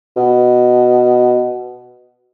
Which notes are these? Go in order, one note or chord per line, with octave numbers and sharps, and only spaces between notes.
B2